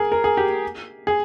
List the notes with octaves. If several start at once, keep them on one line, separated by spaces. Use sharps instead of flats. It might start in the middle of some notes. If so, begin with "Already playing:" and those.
Already playing: G#4 A#4
A#4
G#4
G4
G#4